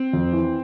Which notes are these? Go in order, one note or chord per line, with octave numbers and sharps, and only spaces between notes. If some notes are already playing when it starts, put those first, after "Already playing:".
Already playing: C4
F2
E3